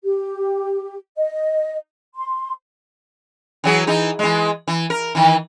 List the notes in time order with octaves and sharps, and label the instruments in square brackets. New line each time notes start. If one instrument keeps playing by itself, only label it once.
[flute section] G4
D#5
C6
[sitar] E3 F#3 G#4
E3 D#4
E3 G#3
E3
A#4
D#3 E3